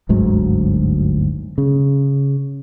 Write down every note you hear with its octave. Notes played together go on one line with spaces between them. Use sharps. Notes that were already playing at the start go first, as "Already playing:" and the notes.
G1 D2 G#2 F#3
C#3